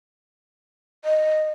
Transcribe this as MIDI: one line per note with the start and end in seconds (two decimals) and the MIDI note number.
1.05 1.52 75